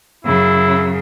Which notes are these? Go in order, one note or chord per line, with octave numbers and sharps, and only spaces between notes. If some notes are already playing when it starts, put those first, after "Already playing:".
F#2 C#3 E4